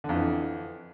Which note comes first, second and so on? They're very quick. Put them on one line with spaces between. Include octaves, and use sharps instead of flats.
D3 F2 E3